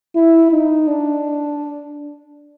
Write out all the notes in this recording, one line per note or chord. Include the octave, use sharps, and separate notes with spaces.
E4
D#4
D4